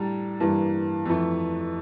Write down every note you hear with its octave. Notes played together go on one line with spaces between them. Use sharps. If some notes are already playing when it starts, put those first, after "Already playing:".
Already playing: A2 G3 D4 A#5
G2 E3 A#3
F2 E3 A3